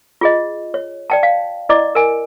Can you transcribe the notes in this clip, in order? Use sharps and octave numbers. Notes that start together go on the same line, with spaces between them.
F4 G#4 D#5
C#5
D5 G5 A5
F5
E4 D5 D#5 D6
A#4 G#5